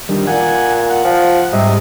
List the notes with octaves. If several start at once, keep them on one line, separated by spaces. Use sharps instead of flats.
D#3 G3 D4
A#2 F#5 G#5
F#5
F3
G#2 C3 G3 D#5